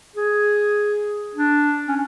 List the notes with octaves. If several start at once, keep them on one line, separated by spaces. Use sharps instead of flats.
G#4
D4
C#4